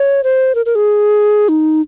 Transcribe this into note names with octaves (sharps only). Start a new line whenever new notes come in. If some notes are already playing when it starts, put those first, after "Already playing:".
Already playing: C#5
C5
A#4
A#4
G#4
D#4